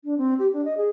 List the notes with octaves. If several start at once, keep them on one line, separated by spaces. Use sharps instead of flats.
D4
C4
G4
D4
D#5
G#4